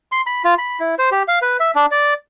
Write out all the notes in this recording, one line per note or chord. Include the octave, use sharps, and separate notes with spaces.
C6
B5
F4
B5
E4
C5
G4
F5
B4
E5
D4
D5